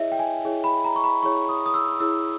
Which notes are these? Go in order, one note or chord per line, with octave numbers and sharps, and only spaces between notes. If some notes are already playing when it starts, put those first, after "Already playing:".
Already playing: E4 G#4 C#5 D#5 E5
G5
G#5
E4 G#4 C#5
B5
A#5
C#6
B5
E4 G#4 C#5 C#6
D#6
D#6
E6
E4 G#4 C#5 E6